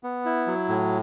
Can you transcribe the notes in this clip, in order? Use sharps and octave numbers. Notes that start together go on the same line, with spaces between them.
B3
E4
F#3
A2